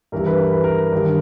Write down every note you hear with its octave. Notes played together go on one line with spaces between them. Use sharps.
G2 E3 G3 A#4
B4
A#4
B4
A#4
G2 D#3 G3